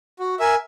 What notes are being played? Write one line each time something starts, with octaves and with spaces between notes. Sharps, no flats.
F#4
A#4 E5 G#5